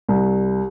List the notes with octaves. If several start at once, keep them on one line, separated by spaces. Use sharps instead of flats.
C2